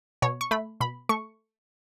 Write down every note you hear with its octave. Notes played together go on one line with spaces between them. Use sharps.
B2 C#5
C#6
A3 B5
B2 B5
A3 C#6